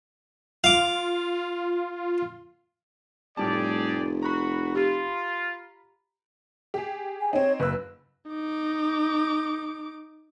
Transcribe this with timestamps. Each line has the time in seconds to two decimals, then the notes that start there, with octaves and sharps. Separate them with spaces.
0.64 F4 F5 D6
3.37 F1 A2 G3 G4 G#4 D5 A5
4.23 F#4 A#5 B5
4.75 F4 G4
6.74 G4 G#4
7.21 G#5
7.33 C4 D#4 C#5
7.60 F#1 B4 E6
8.31 D#4 D6